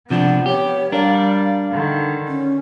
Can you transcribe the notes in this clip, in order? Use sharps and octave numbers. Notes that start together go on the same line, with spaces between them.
C3 F3 B3 D4 F#5
G4 C#5
G3 D4 A#4 D5 F5
D3 D#3
C#4